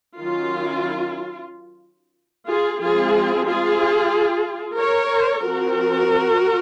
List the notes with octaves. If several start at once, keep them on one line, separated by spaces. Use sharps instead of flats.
D#3 F#3 C#4 F4
F4 G#4
F3 G#3 C4 F4 G#4
F4 G#4
A#4 C#5
F3 C4 F#4 A#4